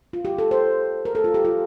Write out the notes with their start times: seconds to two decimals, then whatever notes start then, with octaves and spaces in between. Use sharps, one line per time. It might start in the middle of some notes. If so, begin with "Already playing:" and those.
0.13 F4
0.25 G4
0.38 A4
0.51 C5
1.05 A#4
1.15 A4
1.24 F4
1.34 G4
1.45 F4